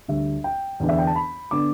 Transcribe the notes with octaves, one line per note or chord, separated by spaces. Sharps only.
D2 D3 G3 D4 E5
G5
E2 D3 B3 D4
E5
G5
A5
B5
D3 B3 D4 D6